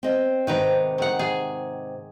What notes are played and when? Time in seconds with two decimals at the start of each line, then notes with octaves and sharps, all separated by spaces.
0.03 C4 D#5
0.47 G#2 C3 D#3 B4 A#5
0.98 D#3 F#5
1.19 G#4